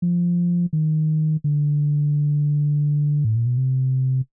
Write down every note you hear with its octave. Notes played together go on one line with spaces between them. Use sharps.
F3
D#3
D3
A2
A#2
B2
C3